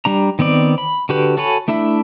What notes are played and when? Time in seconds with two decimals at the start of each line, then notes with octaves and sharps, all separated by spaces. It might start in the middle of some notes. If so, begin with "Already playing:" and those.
0.05 G3 D4 A#5
0.39 D#3 B3 C4 D5
0.78 B5
1.09 D3 F#4 G4 B4
1.37 F#4 A4 C#5 G#5 B5
1.68 A3 D4 E4 E5